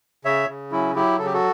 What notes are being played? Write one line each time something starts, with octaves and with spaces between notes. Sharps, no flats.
C#3 C#5 E5
C#3
F#3 C#4 E4
F#3 E4 G4
C#3 A4
G4
F#4 A4